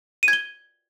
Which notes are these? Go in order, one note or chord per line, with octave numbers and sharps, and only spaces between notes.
D#7
G#6
G7